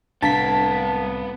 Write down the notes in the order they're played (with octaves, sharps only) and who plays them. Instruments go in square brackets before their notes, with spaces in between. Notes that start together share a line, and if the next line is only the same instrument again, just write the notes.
[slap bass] C2 A2 [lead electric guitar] B3 F5 [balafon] D4 [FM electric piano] A5 B6